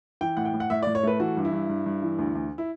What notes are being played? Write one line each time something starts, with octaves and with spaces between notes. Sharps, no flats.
E3 G5
A2 F#5
G5
A2
F#5
A2 E5
D5
A2
C#5
A3 B4
E3 F#4
G2
E4
G2
G2
G2
E3
D2
D2
E4